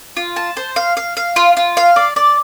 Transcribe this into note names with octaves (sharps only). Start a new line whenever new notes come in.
F4
A5
C5
F5
F5
F5
F4
F4
F5
D5
D5